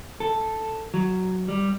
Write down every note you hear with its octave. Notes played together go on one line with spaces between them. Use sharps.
A4
F#3
G3